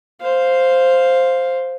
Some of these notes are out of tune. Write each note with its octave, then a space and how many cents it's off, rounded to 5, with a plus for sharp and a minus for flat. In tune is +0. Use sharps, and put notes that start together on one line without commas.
C5 +0 F5 +0